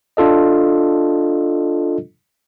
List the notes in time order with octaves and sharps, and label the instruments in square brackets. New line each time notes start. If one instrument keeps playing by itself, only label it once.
[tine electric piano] D4 F4 A4 D#5